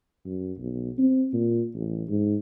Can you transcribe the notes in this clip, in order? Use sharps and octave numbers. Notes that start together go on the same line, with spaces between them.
F#2
B1
C4
A#2
A1
G#2